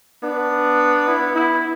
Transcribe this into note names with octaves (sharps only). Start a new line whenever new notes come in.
B3 D4
E4
E4